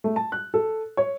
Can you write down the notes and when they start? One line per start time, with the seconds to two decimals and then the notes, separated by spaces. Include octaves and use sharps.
0.04 A3
0.16 A5
0.32 F#6
0.54 A4
0.97 C#5